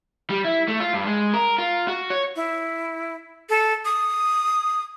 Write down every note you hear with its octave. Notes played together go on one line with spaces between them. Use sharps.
G3
E4
A3
F4
G2
G#3
A#4
F4
F#4
C#5
E4
A4
D#6